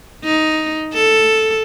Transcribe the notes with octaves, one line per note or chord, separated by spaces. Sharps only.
D#4
A4